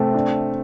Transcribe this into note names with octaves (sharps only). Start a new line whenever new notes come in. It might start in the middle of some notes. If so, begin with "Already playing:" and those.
Already playing: C3 A3 C4
D4